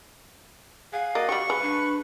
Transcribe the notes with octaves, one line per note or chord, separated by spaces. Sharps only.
G#4 F5 F#5
A#3 F#4 D5 D#5
G3 F#4 G4 C#6
G#3 B4
D4